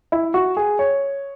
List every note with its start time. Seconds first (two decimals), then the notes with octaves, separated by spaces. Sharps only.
0.12 E4
0.34 F#4
0.57 G#4
0.79 C#5